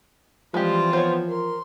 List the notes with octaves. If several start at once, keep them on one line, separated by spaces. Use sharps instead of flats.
E3 F3 G3 G#3 C4 F4 G4
B3 C5 C#5
A#4 C6